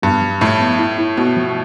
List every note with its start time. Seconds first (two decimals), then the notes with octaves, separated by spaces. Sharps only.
0.03 G2 B3
0.21 F3
0.41 A2 F3
0.60 B3
0.79 E4
0.98 E4
1.17 B2 B3
1.37 F3